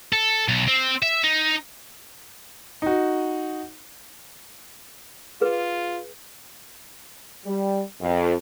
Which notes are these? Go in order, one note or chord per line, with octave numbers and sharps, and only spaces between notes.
A4
B1
C4
E5
D#4
D#4 F#4
F4 G#4 B4
G3
F2